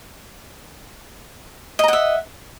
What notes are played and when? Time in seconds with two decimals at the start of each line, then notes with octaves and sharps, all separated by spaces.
1.79 D#5
1.84 A#5
1.88 F#5
1.93 E5